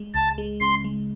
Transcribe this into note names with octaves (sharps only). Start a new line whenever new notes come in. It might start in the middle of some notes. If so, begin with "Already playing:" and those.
Already playing: G#3
C#2 A5
G#3
C#3 C6
G#3